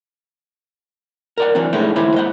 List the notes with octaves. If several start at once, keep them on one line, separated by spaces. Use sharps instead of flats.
A#4 D5 F#5
E3 F#3 C4 D4
A2 G#3 A3 C#4 D#4 E4
D#2 E4 C5 E5 B5
G#3 D#5 F#5